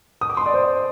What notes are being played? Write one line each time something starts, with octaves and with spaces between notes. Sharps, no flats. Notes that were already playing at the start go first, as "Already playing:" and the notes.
D#6
D6
C6
D5
C5